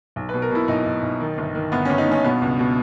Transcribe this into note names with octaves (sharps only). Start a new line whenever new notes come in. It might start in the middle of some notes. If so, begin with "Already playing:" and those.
B1
B2 B4
A#4
B2 E4
B1 D#4
B1
B1
D#3
G1
D#3
G1 B3
G1 C#4
D#4
G2 C#4
B2 B3
C#2
B2